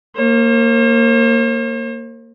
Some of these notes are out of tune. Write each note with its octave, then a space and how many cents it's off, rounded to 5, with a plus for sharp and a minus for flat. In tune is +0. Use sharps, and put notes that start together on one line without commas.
A#3 -15 C5 +45